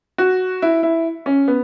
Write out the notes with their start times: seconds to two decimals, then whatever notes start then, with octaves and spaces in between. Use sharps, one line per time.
0.18 F#4
0.62 E4
0.83 E4
1.26 C#4
1.48 B3